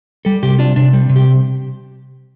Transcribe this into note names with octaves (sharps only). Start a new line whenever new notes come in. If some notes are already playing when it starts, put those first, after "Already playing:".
G3 A4
C3 G4
D4 F4
C3 D4
G3
C3
G4